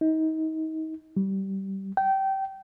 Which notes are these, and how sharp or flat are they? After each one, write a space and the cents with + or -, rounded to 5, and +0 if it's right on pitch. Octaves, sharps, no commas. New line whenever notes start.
D#4 +30
G3 -20
G5 -20